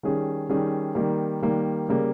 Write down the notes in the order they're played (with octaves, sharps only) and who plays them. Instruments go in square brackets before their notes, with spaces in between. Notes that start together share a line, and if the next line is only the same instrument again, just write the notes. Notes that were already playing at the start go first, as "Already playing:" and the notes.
[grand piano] D#3 G3 C#4 G#4
D#3 G3 C#4 G#4
D#3 G3 A#3
D#3 G3 A#3
C#3 G3 A#3